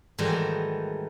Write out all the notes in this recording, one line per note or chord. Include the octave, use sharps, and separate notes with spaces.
G#2 D#3 E3 G3 A3 F#4